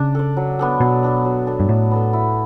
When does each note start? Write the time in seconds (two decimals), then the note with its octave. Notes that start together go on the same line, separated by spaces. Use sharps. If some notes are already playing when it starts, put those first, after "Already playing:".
Already playing: C#3 D4
0.15 A4 D5
0.37 F#3
0.59 B3 D4 A4
0.80 B2 F#3
1.03 B3 D4 A4
1.25 F#3
1.47 B3 D4 A4
1.60 G2
1.69 A2 F#3
1.91 B3 D4 A4
2.13 E4